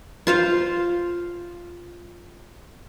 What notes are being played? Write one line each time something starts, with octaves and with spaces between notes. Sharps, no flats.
F4 C5 F5